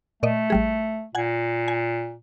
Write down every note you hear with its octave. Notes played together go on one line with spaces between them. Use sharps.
A#2 A3 D5 D#5
A1 G3 G#4
A#2 F#5 G#5 G#6
G#5